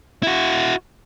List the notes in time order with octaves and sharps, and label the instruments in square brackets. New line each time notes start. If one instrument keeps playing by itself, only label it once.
[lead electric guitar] E4 F#4